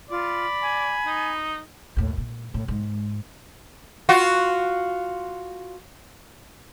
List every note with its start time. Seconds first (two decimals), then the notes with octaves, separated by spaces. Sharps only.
0.10 F4 D5 B5
0.62 G#5
1.06 D#4
1.96 D#2 A2
2.18 A#2
2.54 A2
2.68 G#2
4.09 F4 F#4